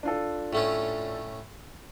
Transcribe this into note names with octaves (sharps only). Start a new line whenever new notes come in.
D4 F4 A4
A2 A3 C#4